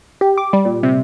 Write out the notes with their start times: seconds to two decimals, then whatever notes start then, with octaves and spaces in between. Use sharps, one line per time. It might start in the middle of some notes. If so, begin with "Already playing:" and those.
0.21 G4
0.38 D6
0.53 G3
0.65 A#2
0.83 C3